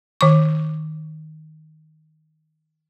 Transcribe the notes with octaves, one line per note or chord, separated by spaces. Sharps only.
D#3 C#6